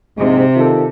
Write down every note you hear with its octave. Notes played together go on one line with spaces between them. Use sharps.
A#1 G#2 C3 G#3
D#3 F4 A4